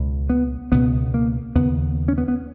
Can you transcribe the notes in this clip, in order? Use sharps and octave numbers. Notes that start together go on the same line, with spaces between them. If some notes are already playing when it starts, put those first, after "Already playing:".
Already playing: C#2 B2
B3
C#2 B2 B3
A#3
D#2 C#3 B3
C#4
B3
B3